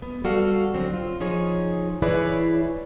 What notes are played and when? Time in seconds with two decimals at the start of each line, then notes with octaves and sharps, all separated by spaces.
0.02 B3
0.24 G3 F#4 A4 F5
0.74 D3 F#3 C4
0.94 F4
1.20 F3 D#4 G#4 C#5
2.02 E3 E4 G#4 B4 C#5 D5